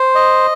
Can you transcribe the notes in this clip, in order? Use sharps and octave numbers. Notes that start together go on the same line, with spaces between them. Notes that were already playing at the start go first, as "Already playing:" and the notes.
Already playing: C5
D#5